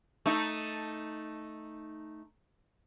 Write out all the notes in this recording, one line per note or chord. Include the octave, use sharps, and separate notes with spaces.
A3 D#4